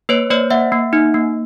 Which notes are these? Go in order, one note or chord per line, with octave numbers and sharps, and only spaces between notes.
A#3 B4 C#5
A#3 C5 D5
A#3 E5 F#5
A#3
D#4
A#3